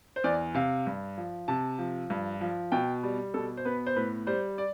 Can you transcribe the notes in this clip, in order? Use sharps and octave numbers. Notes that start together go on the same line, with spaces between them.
C5
E2 D5
C3 F5
G2
F3
C3 A5
F3
G2
F3
B2 G5
G3
B2 A4
C5
B3 B4
C5
A2 B4
G3 C5
D5